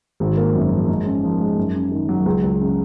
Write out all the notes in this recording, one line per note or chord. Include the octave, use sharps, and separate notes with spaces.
G#1
A#3
F#2
F3
G#2
C#4
F3
G#3
F#2
C#4
D#3
F#3
C#2
C#2
C#3